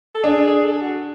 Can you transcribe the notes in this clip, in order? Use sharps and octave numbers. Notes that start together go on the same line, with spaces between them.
A4
D4 G#4
G#4
A4
G#4
F#4